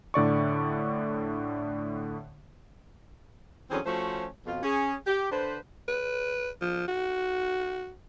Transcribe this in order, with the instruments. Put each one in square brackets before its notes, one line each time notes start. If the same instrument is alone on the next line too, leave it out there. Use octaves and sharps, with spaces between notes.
[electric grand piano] A2 D3 D5 C#6
[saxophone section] D3 E3 F#3 C4 C#4 G#4
F3 A3 C#4 F#4 C5
F2 B2 F4
C#4 G#4
G4
D3 B4 C5
[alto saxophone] B4
F3
F#4